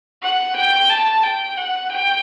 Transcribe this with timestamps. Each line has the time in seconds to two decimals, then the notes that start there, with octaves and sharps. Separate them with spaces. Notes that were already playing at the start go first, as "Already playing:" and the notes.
0.23 F#5
0.56 G5
0.90 A5
1.23 G5
1.57 F#5
1.90 G5